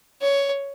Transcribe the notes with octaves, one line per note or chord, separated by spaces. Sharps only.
C#5